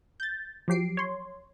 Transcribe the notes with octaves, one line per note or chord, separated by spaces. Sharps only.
G6 A6
F3 F#3 G4 C7 D7
C#5 C6